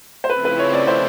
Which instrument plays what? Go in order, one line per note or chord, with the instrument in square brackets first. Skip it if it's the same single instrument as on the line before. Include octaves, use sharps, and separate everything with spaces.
[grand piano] C5
[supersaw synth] C#3 F3 A3 C4 E4 [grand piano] B4
[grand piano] B4
C#5
D5
C5